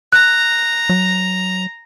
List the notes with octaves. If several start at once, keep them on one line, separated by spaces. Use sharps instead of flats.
A#5 F#6
F#3